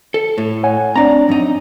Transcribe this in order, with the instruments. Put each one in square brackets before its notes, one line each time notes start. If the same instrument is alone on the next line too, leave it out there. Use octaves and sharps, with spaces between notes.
[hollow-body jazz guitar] A4
A2
[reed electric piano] C#5 F#5 G#5
[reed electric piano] C4 D4 [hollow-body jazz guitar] D5 A#5
[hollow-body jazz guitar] F#2 D#4